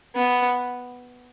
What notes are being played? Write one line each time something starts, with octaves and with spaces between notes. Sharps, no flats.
B3